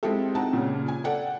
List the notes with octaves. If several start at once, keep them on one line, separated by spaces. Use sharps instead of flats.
G#3 C4 E4 F4 G4 A4
C4 D#4 F#5 A5
A#2 C#3
G#5
A4 D5 F#5 G5